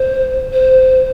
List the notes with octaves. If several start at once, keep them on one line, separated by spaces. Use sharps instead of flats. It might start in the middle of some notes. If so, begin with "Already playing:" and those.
Already playing: C5
C5